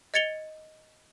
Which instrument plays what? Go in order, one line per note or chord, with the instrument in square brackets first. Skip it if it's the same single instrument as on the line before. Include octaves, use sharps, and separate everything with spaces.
[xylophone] D#5 G#6 A6 C#7 F7 G7